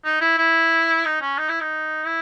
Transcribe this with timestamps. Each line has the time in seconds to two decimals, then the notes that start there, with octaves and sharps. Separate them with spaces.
0.04 D#4
0.21 E4
0.38 E4
1.05 D#4
1.21 C#4
1.38 D#4
1.49 E4
1.61 D#4
2.06 E4